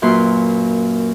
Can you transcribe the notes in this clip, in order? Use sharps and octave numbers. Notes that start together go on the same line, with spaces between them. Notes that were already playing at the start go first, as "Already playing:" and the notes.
F#2 A#2 B4 C6